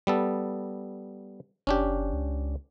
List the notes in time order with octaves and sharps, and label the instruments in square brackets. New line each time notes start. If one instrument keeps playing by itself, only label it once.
[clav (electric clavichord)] G3 B3 A4
[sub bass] F#1 [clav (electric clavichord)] C#4 D4 G4
[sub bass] C#2